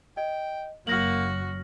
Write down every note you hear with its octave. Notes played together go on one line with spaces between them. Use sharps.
D#5 G5
F#1 F#3 A#3 F#4 F6 A#6 F#7